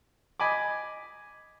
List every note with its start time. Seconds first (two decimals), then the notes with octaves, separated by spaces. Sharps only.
0.40 D#5 G#5 B5 D6